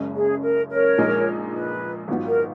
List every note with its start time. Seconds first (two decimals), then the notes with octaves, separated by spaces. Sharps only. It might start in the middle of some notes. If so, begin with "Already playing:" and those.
Already playing: F#1 F#2 C#3 G#3
0.15 G#4
0.43 A#4
0.70 A#4 C#5
0.98 A#1 A#2 G#3 D#4
1.53 B4
2.08 G#1 G#2 F#3 B3 F4
2.27 A#4